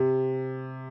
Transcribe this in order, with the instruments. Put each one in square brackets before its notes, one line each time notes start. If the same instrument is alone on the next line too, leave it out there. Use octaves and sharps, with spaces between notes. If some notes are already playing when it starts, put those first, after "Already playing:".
Already playing: [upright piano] C3